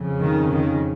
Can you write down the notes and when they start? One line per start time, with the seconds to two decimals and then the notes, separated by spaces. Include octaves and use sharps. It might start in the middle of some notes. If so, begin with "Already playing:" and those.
Already playing: F2 C#3
0.20 D#3
0.51 D#3